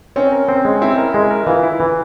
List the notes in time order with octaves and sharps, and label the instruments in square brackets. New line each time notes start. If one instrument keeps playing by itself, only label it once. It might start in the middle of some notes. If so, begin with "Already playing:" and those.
[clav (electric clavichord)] C4 [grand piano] C#4
[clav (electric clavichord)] A#4
C4
G#3
[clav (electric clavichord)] C4 [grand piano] E4
[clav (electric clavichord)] A#4
G#3
A#4
[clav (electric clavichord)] E3 [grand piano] F4
[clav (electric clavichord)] E4
E3